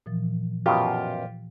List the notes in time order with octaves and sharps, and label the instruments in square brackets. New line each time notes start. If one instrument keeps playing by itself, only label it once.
[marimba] A#2 E3 F3
[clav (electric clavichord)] F#2 B2 [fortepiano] F4 G4